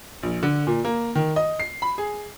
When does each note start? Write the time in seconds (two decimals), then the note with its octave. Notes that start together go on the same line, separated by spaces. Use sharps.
0.23 A#1
0.43 D3
0.67 A#2
0.85 A#3
1.15 D#3
1.36 D#5
1.60 C7
1.82 B5
1.98 G#4